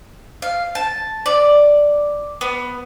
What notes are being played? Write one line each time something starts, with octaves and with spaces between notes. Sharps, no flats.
F5
A5
D5
B3